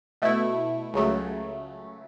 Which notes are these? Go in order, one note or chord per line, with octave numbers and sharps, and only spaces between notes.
B2 A3 E4
C#2 C#3 F#3 A3